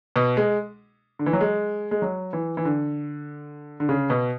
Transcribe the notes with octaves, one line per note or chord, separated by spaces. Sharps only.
B2
G#3
D3
E3
F#3
G#3
G#3
F#3
E3
E3
D3
D3
C#3
B2